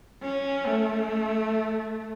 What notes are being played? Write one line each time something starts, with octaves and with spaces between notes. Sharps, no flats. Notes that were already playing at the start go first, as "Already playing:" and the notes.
C#4
A3